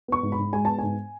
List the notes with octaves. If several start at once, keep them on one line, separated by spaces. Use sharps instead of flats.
B3 C#6
G#2
B5
G#2
G#3 G#5
B3 A5
G#2 G#5